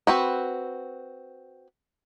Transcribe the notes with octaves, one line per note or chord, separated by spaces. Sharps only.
C4 F#4 B4